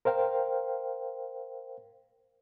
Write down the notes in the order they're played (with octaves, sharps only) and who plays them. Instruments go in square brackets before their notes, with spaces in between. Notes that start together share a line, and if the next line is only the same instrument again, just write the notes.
[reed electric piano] A#4 C5 F5 G5